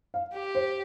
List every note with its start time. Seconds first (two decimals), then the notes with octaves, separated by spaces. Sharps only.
0.14 F5
0.34 G4
0.55 C5